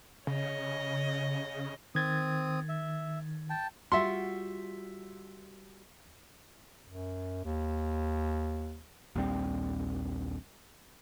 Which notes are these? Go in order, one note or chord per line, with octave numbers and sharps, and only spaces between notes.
C#3 C#5 D#5
D#3 C4 D#6 G#6 A6
E5
G5 A5
G3 F4 F#4 E5 C6
F#2
D#2
A#1 D#2 G3 C4